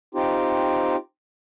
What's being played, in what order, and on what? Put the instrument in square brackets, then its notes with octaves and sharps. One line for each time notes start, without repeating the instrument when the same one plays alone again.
[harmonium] C4 D#4 F4 G4